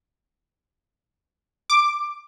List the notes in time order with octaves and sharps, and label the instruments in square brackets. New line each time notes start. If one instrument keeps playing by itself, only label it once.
[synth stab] D6